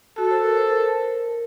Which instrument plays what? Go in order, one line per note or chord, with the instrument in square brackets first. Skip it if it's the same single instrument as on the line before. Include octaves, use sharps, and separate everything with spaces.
[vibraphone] F#4 [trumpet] A4
[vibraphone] C5
A#4
C5
A#4